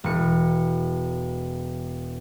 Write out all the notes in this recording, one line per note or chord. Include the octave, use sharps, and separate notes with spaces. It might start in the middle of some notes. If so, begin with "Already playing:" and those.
E1 C#7